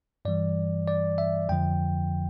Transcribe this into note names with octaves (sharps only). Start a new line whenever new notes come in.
G2 E3 G3 D5
D5
E5
F2 D3 F3 G5